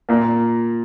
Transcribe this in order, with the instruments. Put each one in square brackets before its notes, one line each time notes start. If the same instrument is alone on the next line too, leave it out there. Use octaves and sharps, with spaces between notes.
[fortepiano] A#2 A#3